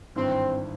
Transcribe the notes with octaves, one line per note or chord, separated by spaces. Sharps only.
G#1 G2 E3 C4